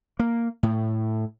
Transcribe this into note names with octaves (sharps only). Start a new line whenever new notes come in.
A#3
A2